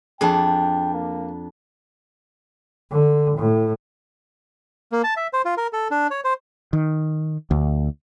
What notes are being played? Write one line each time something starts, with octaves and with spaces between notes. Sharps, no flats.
F2 D4 G#4 G5 A5
A#3
D3
A2
A#3
A5
E5
C5
F4
A#4
A4
D4
C#5
C5
D#3
D2